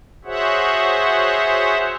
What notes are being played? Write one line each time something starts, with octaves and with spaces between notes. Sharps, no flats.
F#4 G#4 C5 C#5 E5 F#5